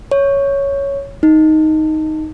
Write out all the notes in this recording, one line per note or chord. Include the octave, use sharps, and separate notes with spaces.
C#5
D#4